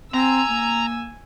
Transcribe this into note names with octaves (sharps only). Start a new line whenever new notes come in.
C4 G#5 A#5 E6
A#3